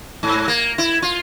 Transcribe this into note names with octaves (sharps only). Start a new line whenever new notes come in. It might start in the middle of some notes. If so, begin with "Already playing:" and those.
G#2
A#3
E4
F4